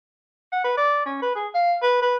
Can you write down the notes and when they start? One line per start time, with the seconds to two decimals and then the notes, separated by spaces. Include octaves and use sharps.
0.52 F#5
0.64 B4
0.77 D5
1.06 C#4
1.22 B4
1.35 G#4
1.54 F5
1.83 B4
2.02 B4